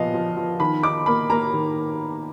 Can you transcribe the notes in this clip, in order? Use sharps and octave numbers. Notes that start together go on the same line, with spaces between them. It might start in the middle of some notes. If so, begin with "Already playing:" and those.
Already playing: A#2 F3 B3 D#5 F5
F3
F3
D#3 B5
D#4 D6
A#3 B5
A#3 A#5
D#3